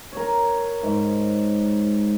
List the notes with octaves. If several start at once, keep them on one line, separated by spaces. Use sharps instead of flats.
A#4 C#5
G#2